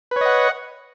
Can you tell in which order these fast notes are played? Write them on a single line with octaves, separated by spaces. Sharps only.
B4 C#5 D#5 F#5